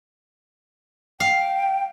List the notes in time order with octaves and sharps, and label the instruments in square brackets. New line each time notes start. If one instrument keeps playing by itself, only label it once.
[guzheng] F5 [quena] G5